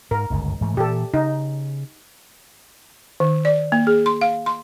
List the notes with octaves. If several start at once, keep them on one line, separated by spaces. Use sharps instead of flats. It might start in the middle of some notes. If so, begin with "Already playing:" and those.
G#2 A#4
G1 C#2 F#2
G#2 E3 A3
A#2 E3 G4 A4
C#3 D#4
D#3
D5
A#3
G#4
C6
F5
C6